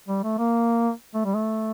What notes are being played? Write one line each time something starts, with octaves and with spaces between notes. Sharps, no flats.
G3
A3
A#3
A3
G3
A3